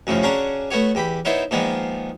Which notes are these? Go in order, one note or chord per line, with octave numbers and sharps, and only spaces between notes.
F#2 A2 C#3 F3
C#3 C#4 D4 F#4 A#5
A3 B3 F#4 C#5
E2 G4 B5
B3 D#4 E4 C5 C#5
A#2 D#3 F3 G#3 B3